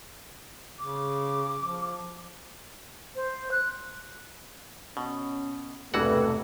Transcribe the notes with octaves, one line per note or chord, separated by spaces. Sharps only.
C#3 D6
F3
C5
F#6
B2 C#4
E1 G2 C3 E3 A3 F#4 F#5